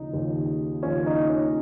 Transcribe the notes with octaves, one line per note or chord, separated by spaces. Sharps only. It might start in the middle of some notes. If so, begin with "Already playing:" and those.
Already playing: D#2 C#3 F3 D#4
D#2 C#3 F3
D#2 C#3 F3 C#4 F4
D#4
C#4